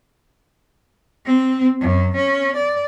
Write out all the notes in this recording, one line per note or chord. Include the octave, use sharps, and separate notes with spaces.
C4
F#2
C#4
D5